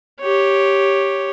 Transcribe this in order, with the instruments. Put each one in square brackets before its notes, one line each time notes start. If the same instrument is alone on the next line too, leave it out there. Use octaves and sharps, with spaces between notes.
[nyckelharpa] G4 C#5